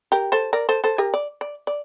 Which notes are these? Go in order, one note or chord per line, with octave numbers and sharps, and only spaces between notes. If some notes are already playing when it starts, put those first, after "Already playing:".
G4 A#4
A4 C5
A#4 D5
A4 C5
A4 C5
G4 A#4
D5
D5
D5